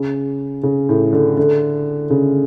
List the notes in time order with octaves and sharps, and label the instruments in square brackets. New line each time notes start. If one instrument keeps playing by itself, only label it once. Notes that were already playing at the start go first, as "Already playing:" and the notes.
Already playing: [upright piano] C#3
C#3
A2
D3
D3
C#3